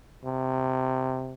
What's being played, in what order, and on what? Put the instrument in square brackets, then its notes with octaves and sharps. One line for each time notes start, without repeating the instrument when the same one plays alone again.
[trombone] C3